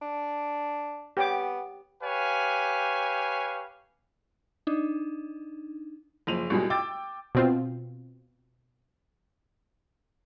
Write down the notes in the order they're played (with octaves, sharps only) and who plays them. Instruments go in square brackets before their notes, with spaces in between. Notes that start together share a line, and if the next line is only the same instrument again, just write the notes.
[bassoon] D4
[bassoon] B3 [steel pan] G4 C#5 D6
[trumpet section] G4 B4 C#5 F5 G#5
[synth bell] D4 D#4
[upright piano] F#1 F3 D#7 F7
C2 B2 F#3 G#3
G5 D6 E6 A6
[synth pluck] B2 C4 F4